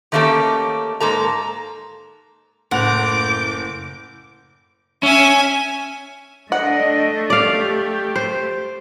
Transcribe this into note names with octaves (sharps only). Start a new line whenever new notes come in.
D#3 A3 A#3 C#4 G4 A4
G#2 A#3 A4 A#5
F#1 A2 F#5 D6 G6 F7
C#4 E5 G#5
A3 D4 D#5 F#5
G4 D5 F5
C5